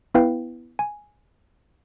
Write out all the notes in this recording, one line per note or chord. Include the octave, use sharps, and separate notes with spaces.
B3 E4 B4 F5 G5
G#5